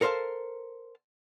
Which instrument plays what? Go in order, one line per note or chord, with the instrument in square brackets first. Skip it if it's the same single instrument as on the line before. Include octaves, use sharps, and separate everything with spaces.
[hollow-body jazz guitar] A4 A#4 C5 C#5 F5 A5